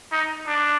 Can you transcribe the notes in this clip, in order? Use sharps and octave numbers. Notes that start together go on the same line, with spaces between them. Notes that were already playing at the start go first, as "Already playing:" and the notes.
D#4
D4